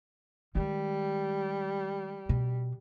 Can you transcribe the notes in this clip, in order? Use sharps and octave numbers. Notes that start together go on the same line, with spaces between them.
D#3 G3 G#3
B2